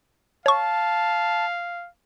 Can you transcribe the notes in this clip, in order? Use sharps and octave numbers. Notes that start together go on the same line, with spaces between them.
C#5 F5 A5 C#6